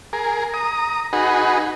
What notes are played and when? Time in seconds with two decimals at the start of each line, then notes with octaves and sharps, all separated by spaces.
0.13 G#4 A#4
0.54 A#5 D#6
1.13 D#4 F#4 G#4 B4